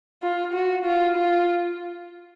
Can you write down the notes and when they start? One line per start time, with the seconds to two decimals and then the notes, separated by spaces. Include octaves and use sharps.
0.22 F4
0.53 F#4
0.85 F4
1.16 F4